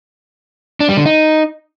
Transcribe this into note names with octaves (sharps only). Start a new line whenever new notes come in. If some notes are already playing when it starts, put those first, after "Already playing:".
D4
G3
D3
D#4